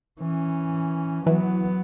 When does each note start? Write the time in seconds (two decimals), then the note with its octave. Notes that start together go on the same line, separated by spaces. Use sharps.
0.20 E3 C#4
1.26 E3 F#3 B3